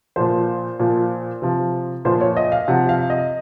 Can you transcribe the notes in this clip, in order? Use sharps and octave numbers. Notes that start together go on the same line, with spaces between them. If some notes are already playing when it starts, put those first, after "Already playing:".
A#2 F3 C5
A#2 F3
C3 F3
A#2 F3 C5
C#5
D#5
F5
C3 F3 F#5
F5
D#5